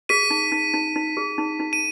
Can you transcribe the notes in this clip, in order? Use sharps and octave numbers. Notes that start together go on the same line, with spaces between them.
G#4 B6 D#7
D#4
D#4
D#4
D#4
G#4
D#4
D#4
D#7